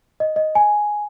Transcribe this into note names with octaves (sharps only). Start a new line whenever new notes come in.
D#5
D#5
G#5